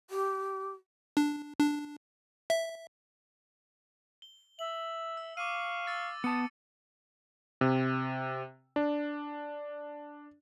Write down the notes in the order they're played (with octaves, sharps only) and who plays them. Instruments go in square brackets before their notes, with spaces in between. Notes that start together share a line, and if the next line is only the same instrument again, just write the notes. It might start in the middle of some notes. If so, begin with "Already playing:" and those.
[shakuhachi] G4
[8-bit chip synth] D4
D4
E5
[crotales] G7
[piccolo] E5 [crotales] F#7
[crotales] E6
[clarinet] F5 [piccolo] C#6 [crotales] D6 D#7
[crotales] E6 A6 D#7
[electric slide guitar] B3 A5 [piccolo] D#6 [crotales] C#7
[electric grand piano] C3
D4